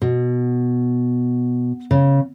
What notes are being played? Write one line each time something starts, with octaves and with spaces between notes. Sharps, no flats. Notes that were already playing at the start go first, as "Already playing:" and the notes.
B2
C#3